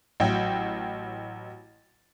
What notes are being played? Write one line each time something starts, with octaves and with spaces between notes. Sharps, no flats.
A1 F#3 G5